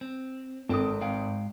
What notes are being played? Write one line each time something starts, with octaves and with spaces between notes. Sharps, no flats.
C4
G#1 C4 A4 G5 D#6
G#2 F5 G5